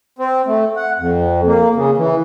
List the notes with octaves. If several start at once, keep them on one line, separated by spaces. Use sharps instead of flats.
C4
A3
F#5
F2
A#3
C#3
E3